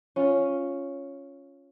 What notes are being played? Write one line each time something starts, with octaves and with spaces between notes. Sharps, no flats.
C#4 F4